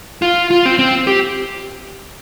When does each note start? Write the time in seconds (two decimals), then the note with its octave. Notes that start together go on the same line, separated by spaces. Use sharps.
0.22 F4
0.51 F4
0.65 C4
0.79 C4
1.07 G4